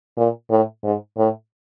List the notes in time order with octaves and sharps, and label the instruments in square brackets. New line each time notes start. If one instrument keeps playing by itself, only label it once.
[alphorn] A#2
A2
G#2
A2